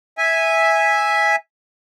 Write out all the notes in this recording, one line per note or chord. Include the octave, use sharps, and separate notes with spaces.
E5 G#5